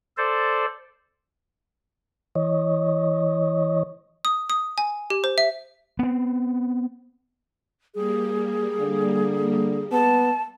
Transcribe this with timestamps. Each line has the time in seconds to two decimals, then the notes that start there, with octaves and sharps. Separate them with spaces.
0.17 A4 C5 D5
2.35 E3 C#5 D#5
4.25 D#6
4.50 D#6
4.78 G#5
5.10 G4
5.24 C5
5.38 E5
5.99 B3 C4
7.95 G3 A#3 G#4
8.80 D3
9.92 B3 A5